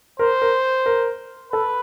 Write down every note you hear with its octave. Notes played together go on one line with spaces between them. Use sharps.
A#4 C5
A#4
A#4
A4 B4